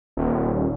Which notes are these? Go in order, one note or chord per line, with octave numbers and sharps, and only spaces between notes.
D#1